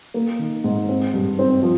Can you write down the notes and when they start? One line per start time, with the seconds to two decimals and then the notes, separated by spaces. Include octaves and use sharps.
0.14 A#3
0.39 D#3
0.64 G#2
0.89 C4
1.14 G2
1.39 C4
1.63 F3